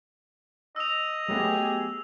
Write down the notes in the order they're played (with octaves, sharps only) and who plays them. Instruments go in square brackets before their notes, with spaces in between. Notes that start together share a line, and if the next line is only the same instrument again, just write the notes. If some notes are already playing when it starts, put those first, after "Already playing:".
[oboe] D#5 [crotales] E6 F7
[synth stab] F#3 A3 B3 [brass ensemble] G4 G#4